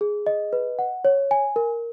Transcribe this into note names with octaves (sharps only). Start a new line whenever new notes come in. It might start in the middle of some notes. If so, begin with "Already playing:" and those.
G#4
D#5
B4
F#5
C#5
G#5
A#4